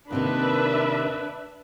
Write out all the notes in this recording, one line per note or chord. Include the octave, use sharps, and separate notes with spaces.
D#2 C3 D#3 D4 B4 E5